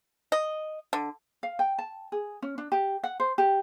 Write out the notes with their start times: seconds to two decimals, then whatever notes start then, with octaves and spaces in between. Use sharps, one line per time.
0.32 D#5
0.93 D3
1.43 F5
1.59 G5
1.79 A5
2.12 G#4
2.42 C#4
2.58 D4
2.72 G4
3.04 F#5
3.20 C5
3.38 G4